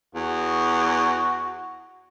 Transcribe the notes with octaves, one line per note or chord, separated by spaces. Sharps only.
E2 F#4